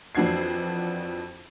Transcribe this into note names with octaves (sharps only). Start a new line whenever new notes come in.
F2 E3 D4 F#4 G#6 C7